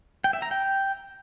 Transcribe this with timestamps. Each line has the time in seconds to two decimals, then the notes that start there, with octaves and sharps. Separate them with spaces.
0.24 G5
0.33 E5
0.42 A#5
0.51 G5